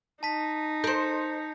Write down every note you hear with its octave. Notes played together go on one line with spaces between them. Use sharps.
D#4 A5 B6
A#4 C5 G6 C#7